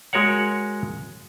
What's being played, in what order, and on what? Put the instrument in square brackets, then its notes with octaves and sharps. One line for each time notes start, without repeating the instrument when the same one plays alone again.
[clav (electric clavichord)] G#3 F#4 A#4 C#5 F#5